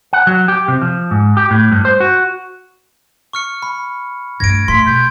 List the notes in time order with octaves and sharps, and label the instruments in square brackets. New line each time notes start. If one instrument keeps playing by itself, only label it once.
[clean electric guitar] F#5
F#3
G4
C3
F3
G#2
G4
A2
G2
C5
F#4
[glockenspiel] C#6 F6 C#7
B5
[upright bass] G2 A3 [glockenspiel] G#6 D7 [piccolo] A#6
[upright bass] A2 A3 [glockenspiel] C6 [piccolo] B6
[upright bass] B2 [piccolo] G6